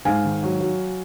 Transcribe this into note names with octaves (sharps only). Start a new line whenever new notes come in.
G#2 F5 G#5
D#3
F#3
F#3